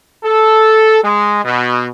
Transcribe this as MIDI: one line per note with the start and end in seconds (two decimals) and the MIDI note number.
0.24 0.99 69
1.03 1.41 56
1.44 1.87 47